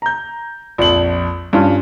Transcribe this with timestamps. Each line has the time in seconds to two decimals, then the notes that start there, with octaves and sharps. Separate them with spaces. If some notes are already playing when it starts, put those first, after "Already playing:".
0.02 A#5 G6
0.78 A#1 F2 F#7
1.53 G2 C#4 F4